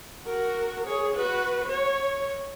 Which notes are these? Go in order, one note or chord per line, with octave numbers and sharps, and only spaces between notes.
F#4 A#4
G#4 C#5
F#4 B4
C#5